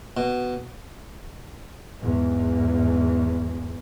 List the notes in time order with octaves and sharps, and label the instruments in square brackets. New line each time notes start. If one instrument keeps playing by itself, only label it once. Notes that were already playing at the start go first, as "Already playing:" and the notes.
[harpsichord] B2
[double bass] E2 G#2